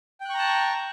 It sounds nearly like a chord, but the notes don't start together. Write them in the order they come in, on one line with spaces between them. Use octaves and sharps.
G5 F#6 C#6 A#5 A5